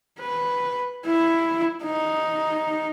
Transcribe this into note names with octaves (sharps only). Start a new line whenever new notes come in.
B4
E4
D#4